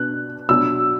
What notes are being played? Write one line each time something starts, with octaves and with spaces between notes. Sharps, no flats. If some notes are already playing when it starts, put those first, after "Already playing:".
Already playing: B2 B3 D4 F#6
B2 F#3 D4 E6